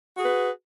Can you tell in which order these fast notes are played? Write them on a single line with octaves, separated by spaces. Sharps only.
F#4 G#4 B4